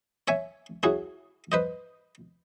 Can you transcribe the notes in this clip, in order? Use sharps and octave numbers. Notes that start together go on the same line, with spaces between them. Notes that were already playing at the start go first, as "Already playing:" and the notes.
C#5 E5 G#5
C#4 E4 F#4 G#4
B4 C5 D#5